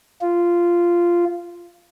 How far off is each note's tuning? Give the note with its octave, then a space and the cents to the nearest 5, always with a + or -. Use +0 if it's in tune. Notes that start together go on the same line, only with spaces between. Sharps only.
F4 -10